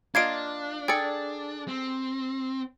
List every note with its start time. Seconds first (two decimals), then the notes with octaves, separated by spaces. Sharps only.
0.15 A#3 D4 F4 D#5 G#6 C7 D7
0.88 G#4 A4 D5 G5 C#7
1.68 C4